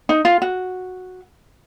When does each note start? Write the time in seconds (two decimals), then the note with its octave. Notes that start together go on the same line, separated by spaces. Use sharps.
0.09 D#4
0.25 F4
0.42 F#4